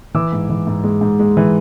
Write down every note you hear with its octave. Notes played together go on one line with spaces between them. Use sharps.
E3 D6 E6
G#2
E3
G#2
G#3
G#2
G#3
E3